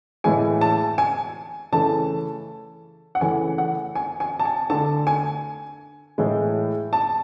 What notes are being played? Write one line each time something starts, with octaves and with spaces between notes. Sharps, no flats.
A2 E3 G#3 G#5
A5
G#5
C#3 E3 A3 A5
F#5
C#3 E3 A3 G#5
F#5
G#5
G#5
A5
G#5
D3 A3 A5
G#5
A2 E3 G#3
A5